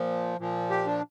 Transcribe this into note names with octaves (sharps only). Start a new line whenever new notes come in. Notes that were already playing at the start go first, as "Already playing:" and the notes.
Already playing: A#2 F3
A#2 F3
G4
D4